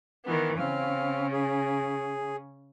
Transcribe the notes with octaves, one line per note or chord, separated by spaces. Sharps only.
D#3 E3 B3
C#3 C4 C#4 F5
G#4